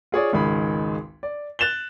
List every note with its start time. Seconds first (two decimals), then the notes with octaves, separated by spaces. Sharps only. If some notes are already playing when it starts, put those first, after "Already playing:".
0.12 F4 G#4 C#5 D5
0.32 G#1 C#2 D#3 G#3 B5
1.23 D5
1.59 F#6 A6 E7 F7 G7